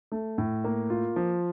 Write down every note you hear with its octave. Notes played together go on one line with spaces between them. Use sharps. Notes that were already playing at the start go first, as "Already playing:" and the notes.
A3
A2
A#3
F4
F3